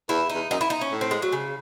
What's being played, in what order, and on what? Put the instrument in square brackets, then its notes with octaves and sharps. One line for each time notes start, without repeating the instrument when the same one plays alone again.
[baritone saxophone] E2 [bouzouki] E4
[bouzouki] D#4
[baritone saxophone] E2
[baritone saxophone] F#2 [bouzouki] D#4
[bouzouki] E4
D#4
C#4
[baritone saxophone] A2
[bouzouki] C4
G#3
F#3
C#3